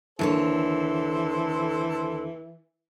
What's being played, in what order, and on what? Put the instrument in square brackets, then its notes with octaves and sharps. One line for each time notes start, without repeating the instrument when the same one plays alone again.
[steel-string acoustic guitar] D#2 D3 C#5 [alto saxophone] E3 [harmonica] A4 C5